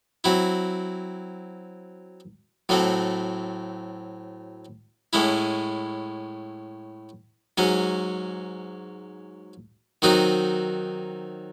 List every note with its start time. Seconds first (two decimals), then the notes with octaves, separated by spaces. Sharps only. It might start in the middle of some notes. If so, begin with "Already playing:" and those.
0.24 F#3 C4 E4
2.69 A2 F#3 A3 C4
5.13 A2 G#3 C#4 E4
7.58 G#2 F#3 C#4
10.02 D#3 F#3 C4 D#4 F#4